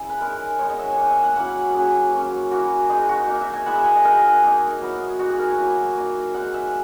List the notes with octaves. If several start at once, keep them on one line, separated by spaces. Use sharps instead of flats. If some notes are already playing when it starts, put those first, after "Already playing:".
Already playing: C#4 E4 G#4
B4
G#3 D#4 A#4
G#3 B3 D#4 C#5
D#5
E5
G#5
A#3 D#4 F#5
E5
F#5
F#3 A#3 C#4 E4 F#5
F#3 A#3 C#4 G#4
F#3 A#3 C#4
A#3 E4 F#4
G#3 D#4 G#4
F#4
A#3 D#4
E5
G#5
G#3 B3 E4 F#5
E5
F#5
D#5
G#3 D#4 A#4
G#4
A#3 D#4 G#4
F#3 B3 E4
A#3 D#4 F#4
G#4
A#4
G#5
F#3 A#3 E4
A#3 D#4
G#3 D#4 F#5
E5